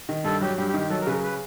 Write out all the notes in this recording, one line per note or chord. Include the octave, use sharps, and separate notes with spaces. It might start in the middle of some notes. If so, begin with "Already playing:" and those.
D#3
G2 A4
F#3 G4
G2 G4
G4
D#3
G4
F#3 A4
A#4
C#3 B4
A#4
B4